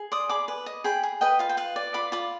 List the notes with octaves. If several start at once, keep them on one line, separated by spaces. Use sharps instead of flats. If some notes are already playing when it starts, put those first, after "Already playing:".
Already playing: G#4
D5 C6 D#6
G#4 B5 D6
B4
D#5
G#4 G5 B5
G#4
B4 D#5 G5
F4 F5
G5
B4 F5
D5
F4 B5 D6
F4 B5 D6